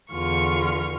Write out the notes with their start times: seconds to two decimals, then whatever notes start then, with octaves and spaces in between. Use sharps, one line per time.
0.12 E2 D3 F4 C#6 F6